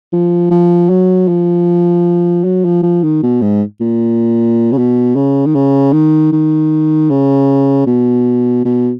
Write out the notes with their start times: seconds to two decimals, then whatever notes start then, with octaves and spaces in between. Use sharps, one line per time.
0.12 F3
0.51 F3
0.89 F#3
1.28 F3
2.44 F#3
2.64 F3
2.83 F3
3.03 D#3
3.22 B2
3.41 G#2
3.80 A#2
4.72 C#3
4.78 B2
5.16 C#3
5.46 D#3
5.55 C#3
5.93 D#3
6.32 D#3
7.10 C#3
7.87 B2
8.65 B2